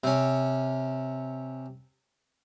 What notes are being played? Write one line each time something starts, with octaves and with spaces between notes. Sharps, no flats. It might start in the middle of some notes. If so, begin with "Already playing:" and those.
C3 C#4